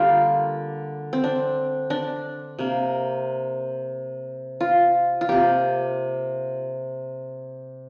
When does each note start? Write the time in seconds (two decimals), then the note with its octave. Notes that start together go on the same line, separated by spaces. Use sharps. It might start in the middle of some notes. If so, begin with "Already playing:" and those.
Already playing: D3 G3 A#3 F4 G4
1.13 C4
1.24 D4
1.90 D4
2.59 C3 A#3
4.61 F4
5.21 F4
5.28 C3 A#3 G4